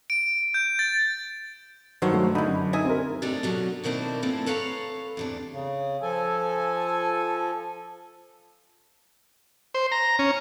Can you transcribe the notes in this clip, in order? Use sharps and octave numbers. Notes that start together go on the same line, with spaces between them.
D7
G6
A6
G2 D3 D#3 F#3 C5 C#5
A3
D3 D#4 E4 B5
F#2
D#4 D#5 E5 G#5
C4 A#4
C3 A3 D4 D#4 G4
B2 D3 F#3
B2 D#3 A#3 C4 D4 E4
D3 E3 F3 A3 C4 A4
A4 B4 C#5 F5 A#5
E2 C3 D4
C#3
F3 A4 G#5
C5
A#5
C#4